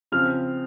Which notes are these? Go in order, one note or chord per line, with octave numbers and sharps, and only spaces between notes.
C#3 F3 C4 F6